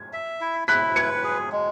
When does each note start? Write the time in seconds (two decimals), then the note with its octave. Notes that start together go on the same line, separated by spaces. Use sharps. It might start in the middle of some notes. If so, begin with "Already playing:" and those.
Already playing: G#6
0.13 E5
0.41 E4
0.68 E4 F#6 B6
0.96 B4 G#6 C#7
1.24 G#4
1.52 G#3